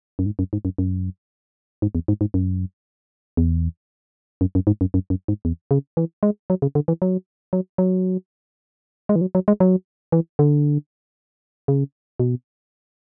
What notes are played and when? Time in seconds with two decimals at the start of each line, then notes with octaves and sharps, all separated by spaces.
0.19 F#2
0.26 G#2
0.39 F#2
0.53 G#2
0.65 F#2
0.78 F#2
1.82 G#2
1.95 E2
2.08 G#2
2.21 G#2
2.34 F#2
3.37 E2
4.41 F#2
4.55 F#2
4.67 G#2
4.81 F#2
4.94 F#2
5.10 F#2
5.28 G#2
5.45 E2
5.71 C#3
5.97 E3
6.23 G#3
6.50 F#3
6.62 C#3
6.75 D3
6.88 E3
7.02 F#3
7.53 F#3
7.78 F#3
9.09 G#3
9.16 E3
9.21 F#3
9.35 F#3
9.48 G#3
9.60 F#3
10.12 E3
10.39 D3
11.68 C#3
12.20 B2